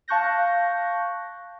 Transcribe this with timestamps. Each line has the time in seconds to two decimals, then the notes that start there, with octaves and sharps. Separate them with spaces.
0.08 F5 A5 C#6 F#6 G6 A#6